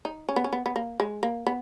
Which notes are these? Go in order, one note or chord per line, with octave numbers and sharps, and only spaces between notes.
D#4
C#4
B3
C#4
B3
B3
A#3
G#3
A#3
B3